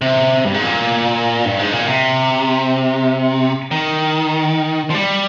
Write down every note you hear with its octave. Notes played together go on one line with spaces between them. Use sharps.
C3
G2
G#2
A#2
G2
G#2
A#2
C3
D#3
F3
G3